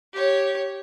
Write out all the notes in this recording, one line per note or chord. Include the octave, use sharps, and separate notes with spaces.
G4 C#5